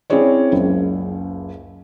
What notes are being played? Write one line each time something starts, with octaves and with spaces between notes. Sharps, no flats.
C4 C#4 E4 G#4 C#5 D5
F#1 C#2